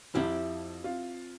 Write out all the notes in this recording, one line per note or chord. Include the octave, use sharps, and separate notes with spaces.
F2 F3 E4 G4 E5
C4 F4